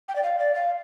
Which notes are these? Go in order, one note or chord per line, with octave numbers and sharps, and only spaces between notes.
G5
D5
F5
D5
F5